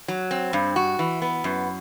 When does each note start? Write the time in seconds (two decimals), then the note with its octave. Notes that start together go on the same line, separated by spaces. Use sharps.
0.08 F#3
0.31 C4
0.53 G2
0.76 F#4
0.99 E3
1.22 B3
1.44 F#2